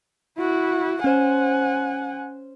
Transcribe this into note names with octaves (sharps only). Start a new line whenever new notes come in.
E4 F#4
C#4 C5 F#5 G#5